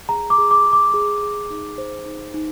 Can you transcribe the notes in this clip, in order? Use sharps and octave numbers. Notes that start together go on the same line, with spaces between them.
G#4 A#5
D6
G#4
D6
G#4
D6
G#4
G#4
D#4
C5
D#4
D#4